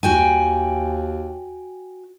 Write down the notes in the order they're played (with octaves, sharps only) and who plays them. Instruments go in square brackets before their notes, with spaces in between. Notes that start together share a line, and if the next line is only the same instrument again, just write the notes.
[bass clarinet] D#2 [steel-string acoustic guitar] F#4 G5 G#5